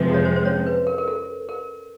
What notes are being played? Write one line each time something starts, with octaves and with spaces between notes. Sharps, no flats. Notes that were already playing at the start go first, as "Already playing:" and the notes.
Already playing: F2 C3 F3 G#3 B4
C#5
C5
C5
C#4 C#5
B4
A#4
A#4
A4
A#4